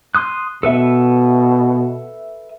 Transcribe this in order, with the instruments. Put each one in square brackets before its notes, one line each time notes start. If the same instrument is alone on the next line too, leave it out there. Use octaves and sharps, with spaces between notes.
[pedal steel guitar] C6 D#6 F#6
[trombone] B2 [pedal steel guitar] A4 B4 E5